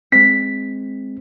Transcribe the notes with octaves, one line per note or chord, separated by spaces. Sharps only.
G#3 C4 B6